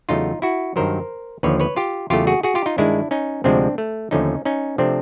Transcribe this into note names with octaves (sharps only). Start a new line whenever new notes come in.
E2 C#3 F#3 A3 D#4 F4
E4 F#4
G2 D#3 F#3 A#4 C5
D#2 D3 F3 B4 C#5
B4 C#5
F4 G4
E2 C#3 F#3 A3 F4 G4
F#4 G#4
F#4 G#4
F4 G4
D#4 F4
G2 D#3 G#3 D4 E4
C#4 D#4
D2 C3 F3 G#3 C4 D4
A3
D#2 D3 F3 A3 C#4 D#4
C#4 D#4
C3 F3 A3 C4 D4